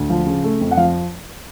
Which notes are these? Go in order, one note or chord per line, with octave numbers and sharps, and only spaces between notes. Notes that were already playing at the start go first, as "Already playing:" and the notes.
Already playing: D2
F3
C#3
A3
F2
F#5
F3 F5